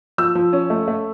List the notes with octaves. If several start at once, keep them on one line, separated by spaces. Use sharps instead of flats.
F3 E6
F3
C#4
A3
A3